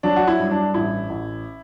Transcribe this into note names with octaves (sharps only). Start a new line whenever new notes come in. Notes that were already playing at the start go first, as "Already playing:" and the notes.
F#3 D4
F#4
E4
G2
D4
A1 E4
A1